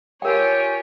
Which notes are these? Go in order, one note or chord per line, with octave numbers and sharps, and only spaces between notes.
F4 G4 A#4 C#5 G5 G#5